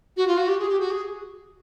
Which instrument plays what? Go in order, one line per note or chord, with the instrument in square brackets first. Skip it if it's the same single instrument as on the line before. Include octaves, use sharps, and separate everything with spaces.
[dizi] F#4
F4
F#4
G4
G#4
G4
F#4
G#4